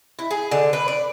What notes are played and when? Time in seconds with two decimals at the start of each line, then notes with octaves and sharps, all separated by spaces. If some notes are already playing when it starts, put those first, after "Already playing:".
0.19 E4
0.31 G#4
0.51 D3
0.73 B4
0.88 D5